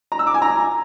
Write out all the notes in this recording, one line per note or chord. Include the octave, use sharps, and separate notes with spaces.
A#5
E6
D6
G#5
A#5